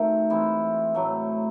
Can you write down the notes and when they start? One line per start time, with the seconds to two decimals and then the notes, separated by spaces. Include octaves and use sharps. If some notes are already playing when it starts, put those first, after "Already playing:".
Already playing: D#3 A3 C4 F#4
0.30 E3 G#3 C4 E4
0.94 A2 F#3 A3